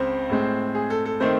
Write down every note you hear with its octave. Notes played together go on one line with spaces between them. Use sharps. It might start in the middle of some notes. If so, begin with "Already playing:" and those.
Already playing: C#2 C#3 C4 C5
A2 G#3 C4
G#4
A4
A4
D#3 A3 C4 C5